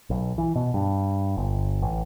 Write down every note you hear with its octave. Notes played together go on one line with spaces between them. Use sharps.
B1
E3
B2
G2
G1
A1